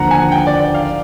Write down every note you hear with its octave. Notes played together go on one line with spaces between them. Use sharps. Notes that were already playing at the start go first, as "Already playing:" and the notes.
Already playing: D#2 D3 F3 F#5 A#5
G#5
G5
D5
D5
F5